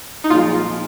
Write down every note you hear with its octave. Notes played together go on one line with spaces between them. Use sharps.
D#4
A#2 F3 G#3 F4